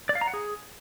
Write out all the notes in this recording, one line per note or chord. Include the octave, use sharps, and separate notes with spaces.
D5
F5
A#5
F#5
G#4